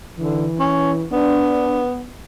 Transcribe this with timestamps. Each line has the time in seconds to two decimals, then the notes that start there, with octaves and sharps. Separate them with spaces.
0.18 D3 E3
0.60 C#4
1.12 B3 D4